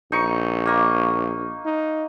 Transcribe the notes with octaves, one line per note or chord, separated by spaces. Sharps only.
A#1 D#4 C#6
A#3 D#5 C#6
D#4